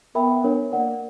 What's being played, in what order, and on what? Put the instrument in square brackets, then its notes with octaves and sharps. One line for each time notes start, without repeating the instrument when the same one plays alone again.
[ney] B3 [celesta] A#4 E5 G5 B5
[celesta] D4 A#4 C#5
[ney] A#3 [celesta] A#4 D5 F#5